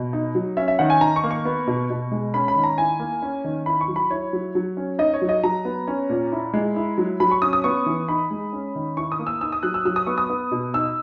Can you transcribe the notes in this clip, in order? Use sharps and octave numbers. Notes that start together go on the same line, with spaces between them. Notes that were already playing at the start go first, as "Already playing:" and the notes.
Already playing: B2
D#4
F#3
C#4 E5
E5
D#3 F#5
G#5
D#3 A#5
C#6
A#3
C#6
B3
B2
B2
G#3
C#4 B5
B5
D#3
A#5
E4 G#5
A#3
C#4
D#3
E4 B5
C#6
F#3
B5
E4 C#5
F#3
F#3
C#4
D#4 D#5
C#5
F#3
D#5
F#3 A#5
B3
C#4
A#2
E4
G#3
E4
F#3
F#3 B5
C#6
C#4 D#6
D#6
B3 C#6
E3
D#4 B5
G#3
C#4
D#3
E4 C#6
D#6
A#3
E6
D#4 E6
D#6
F#3 F#6
E6
F#3 E6
D#6
B3 C#6
D#6
B3
B2
D#4 E6